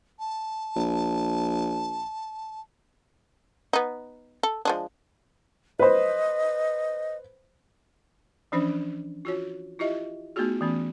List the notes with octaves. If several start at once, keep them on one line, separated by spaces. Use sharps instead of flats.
A5
A#1
B3 D#4
A4
F3 G#3 D4
B4 C5 D#5
E3 F3 C#4 D4 C5
F4 F#4 C#5
E4 F4 G4 D#5 E5
A3 B3 D#4 F4 F#4 G#4
E3 A3 B3 C#4